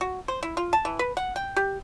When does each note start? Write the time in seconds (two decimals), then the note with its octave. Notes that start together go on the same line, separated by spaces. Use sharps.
0.01 F#4
0.28 C5
0.43 E4
0.57 F4
0.73 A5
0.85 E3
0.99 B4
1.17 F#5
1.36 G5
1.56 G4